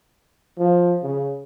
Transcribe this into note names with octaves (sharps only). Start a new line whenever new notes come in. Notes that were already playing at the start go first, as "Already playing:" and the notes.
F3
C#3